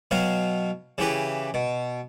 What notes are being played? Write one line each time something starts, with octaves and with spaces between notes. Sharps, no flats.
B2 F#3 F5 G5
C#3 E3 G4 B4
B2